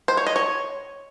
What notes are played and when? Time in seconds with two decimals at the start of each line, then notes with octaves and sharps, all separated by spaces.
0.08 C5
0.17 C#5
0.27 D#5
0.36 C#5